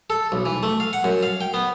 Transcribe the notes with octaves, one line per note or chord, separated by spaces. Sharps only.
A4
B1
E3
A3
F5
F#5
F#2
F5
G5
B3